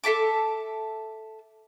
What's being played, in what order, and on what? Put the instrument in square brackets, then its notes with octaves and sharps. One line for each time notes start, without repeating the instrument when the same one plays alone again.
[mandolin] A4 E5 A5 D6